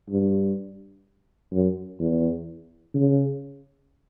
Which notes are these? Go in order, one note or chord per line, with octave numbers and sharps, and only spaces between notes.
G2
F#2
E2
C#3